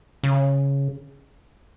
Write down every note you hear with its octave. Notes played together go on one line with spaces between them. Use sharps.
C#3